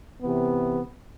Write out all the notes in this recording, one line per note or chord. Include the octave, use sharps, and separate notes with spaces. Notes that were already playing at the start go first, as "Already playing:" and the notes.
C3 E3 B3